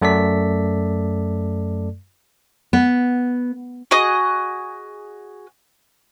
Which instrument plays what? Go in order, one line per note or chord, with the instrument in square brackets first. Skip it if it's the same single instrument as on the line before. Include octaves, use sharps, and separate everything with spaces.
[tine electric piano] F#2 A3 A4 D5 B6
[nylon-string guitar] B3
[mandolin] F#4 G#4 D#5 D#6